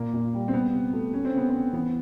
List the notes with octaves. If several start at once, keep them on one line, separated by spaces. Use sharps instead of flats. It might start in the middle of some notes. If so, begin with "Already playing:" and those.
Already playing: A#2 A#3
A#2
G3
C4
C3 B3
C3
A3
A3 C#4
C4
C#3 B3
C4
C#3
E3 B3